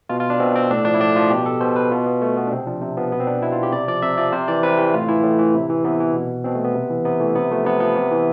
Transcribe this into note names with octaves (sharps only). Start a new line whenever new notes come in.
B2 F4
F4
D4
B2 C4
C4
A2 D4
F3 D4
E4
A2 D4
F3 F4
B2 G4
A4
B2 C5
B4
B2 F4
B3
B2 A3
B3
D4
C3 C4
F3 D4
C3
F3 B3
B2 B3
C4
D4
B2 E4
F4
G4
C3 D5
F3 D5
C3 E5
F3 D5
C3 C5
E3 D5
C3 B4
E3 G4
A2 F4
E3 E4
A2
E3
C3
E3
C3 B3
E3
B2
B2 C4
A3
B3
C3
E3
C3 B3
E3 A3
C3 B3
F3 A3
C3 B3
F3 B3
C3
E3